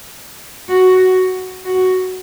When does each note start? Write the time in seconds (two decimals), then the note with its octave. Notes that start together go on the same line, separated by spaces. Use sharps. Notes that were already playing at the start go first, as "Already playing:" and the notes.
0.68 F#4
1.65 F#4